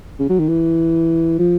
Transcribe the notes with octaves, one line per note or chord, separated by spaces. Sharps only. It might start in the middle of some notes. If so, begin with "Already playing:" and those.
C#3
F#3
D#3
E3
F3